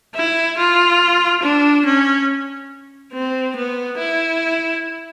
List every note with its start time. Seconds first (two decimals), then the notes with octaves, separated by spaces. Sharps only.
0.15 E4
0.57 F4
1.43 D4
1.85 C#4
3.13 C4
3.56 B3
3.98 E4